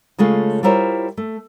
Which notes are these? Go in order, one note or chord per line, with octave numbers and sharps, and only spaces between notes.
C#3 G#3 A3 F4
G3 E4 F4 A#4 C5 C#5
A3